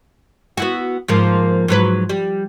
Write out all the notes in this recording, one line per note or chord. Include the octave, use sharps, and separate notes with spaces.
B3 E4 F#4
G#2 F3 A#3
G#2 F#3 B4
G3